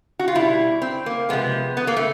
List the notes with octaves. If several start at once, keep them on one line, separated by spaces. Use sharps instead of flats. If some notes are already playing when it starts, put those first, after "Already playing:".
F#4
F4
B2 G3 E4
C4
A#3
C3 F3 G#3 B3
B3
A#3
A3